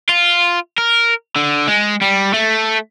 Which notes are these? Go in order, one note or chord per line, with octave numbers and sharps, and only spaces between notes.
F4
A#4
D3
G#3
G3
A3